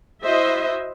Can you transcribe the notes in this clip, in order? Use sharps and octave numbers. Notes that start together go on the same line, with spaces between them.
E4 F#4 C5 D#5 E5